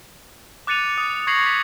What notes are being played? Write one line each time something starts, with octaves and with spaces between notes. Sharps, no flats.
D6 F#6 A6 C#7 D#7 F7
D#6
C#6 G#6 A#6 C7 C#7 F#7
B6